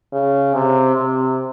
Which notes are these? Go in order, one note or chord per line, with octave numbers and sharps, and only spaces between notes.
C#3
C3
C3